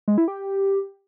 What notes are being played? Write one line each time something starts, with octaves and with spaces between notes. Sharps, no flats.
G#3
E4
G4